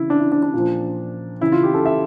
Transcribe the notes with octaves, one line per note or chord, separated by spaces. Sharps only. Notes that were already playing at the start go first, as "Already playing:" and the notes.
Already playing: C#3 E3 E4
D4
E4
D4
D4
A#2 F3
C#3 E3 E4
F4
G4
A4
E5